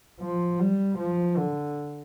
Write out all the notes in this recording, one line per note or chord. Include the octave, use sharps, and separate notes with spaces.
F3
G3
F3
D3